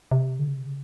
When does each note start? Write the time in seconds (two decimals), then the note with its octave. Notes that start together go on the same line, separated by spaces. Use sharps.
0.11 C3
0.39 D3
0.48 C#3
0.57 C3
0.66 C#3